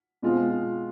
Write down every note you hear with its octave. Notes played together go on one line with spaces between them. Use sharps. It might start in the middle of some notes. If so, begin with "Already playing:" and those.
B2 G#3 C4 F4